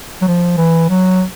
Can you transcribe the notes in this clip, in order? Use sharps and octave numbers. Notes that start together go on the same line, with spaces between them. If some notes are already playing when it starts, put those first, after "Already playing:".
F#3
F3
E3
F#3